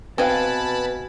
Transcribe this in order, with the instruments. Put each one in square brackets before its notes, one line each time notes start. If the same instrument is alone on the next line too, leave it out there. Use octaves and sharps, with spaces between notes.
[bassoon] B2 [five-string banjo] C4 B4 F5 [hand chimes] G#5 G#6 [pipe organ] A5 B5